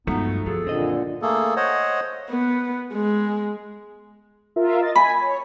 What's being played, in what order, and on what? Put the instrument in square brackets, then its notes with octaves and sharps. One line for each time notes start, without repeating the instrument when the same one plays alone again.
[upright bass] G2 G#3 [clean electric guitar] F3 F#3 A3 [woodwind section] B3 D#4
[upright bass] D#3 [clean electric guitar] F3 F#3 [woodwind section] G#4 A4
[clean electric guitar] F#2 C4 D#5 [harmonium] A#2 D3
[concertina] A3 A#3 G#4 A4
C5 C#5 D#5 F#5
[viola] B3
G#3
[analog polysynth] F4 A#4 E5
D#5 A6
[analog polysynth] G#5 [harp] B5
[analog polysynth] C#5